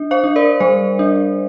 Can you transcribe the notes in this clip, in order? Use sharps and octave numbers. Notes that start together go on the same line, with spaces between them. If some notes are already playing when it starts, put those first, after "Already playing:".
Already playing: D4
C5 F5
D4
A#4 D5
G3 C5
D4